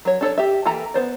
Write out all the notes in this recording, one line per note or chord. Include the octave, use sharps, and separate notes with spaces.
F#3 C#5
D4 A4 C#5
G4 E5
E3 A#3 A4 G5 A#5
B3 C5 D5